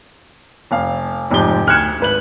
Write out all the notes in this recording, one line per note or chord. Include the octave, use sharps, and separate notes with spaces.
F1 F5
F1 G#2 F3 G4 G7
D2 F6 F#6 G#6 C#7 E7
G#1 B4 F#7